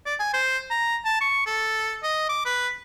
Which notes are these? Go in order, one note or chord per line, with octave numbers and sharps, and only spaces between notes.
D5
G#5
C5
A#5
A5
C#6
A4
D#5
D6
B4